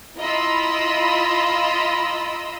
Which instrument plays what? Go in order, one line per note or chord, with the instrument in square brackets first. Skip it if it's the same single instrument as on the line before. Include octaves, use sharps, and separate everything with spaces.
[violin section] E4 F4 D#5 A#5 B5 E6